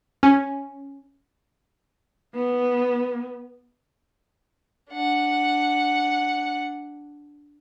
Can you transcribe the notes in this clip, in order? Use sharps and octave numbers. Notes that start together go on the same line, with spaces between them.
C#4
B3
D4 F#5